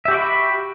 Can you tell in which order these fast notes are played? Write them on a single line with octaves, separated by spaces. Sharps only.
E5 G4 F#4 G5 B5